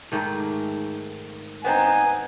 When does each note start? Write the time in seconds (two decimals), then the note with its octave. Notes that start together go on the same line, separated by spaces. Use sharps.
0.12 G#2 D#3 A3
1.65 B3 C4 D#4 G#5